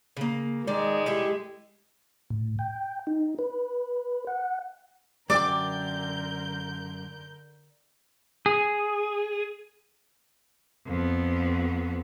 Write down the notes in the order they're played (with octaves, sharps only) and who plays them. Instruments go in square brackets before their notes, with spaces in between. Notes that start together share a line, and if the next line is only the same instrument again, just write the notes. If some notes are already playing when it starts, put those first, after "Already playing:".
[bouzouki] C#3 A#3
[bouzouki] D#3 D5 [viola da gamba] G#3
[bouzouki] E4 G4 A4
[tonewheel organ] A2
G5
D#4
B4
F#5
[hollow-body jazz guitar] F#2 G5 [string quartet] D3 A#4 G6 [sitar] D5 [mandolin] D6
[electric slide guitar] G#4
[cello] F2 B3